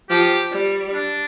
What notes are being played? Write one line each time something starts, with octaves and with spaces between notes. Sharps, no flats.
F3 G4
G3
D4